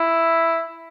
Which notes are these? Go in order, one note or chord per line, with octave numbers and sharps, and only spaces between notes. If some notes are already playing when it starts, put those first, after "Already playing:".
Already playing: E4